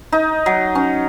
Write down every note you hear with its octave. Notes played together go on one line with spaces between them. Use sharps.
D#4
F#3
C#4